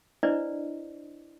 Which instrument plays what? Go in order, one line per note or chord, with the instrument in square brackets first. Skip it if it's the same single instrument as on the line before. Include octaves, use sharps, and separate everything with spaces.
[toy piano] D4 E4 B4 C5 D5 D#5